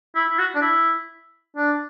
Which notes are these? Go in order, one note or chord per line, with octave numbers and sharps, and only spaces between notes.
E4
E4
F#4
D4
E4
D4